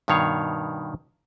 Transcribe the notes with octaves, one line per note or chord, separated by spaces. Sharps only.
G2 B2 D#3 C#5 F5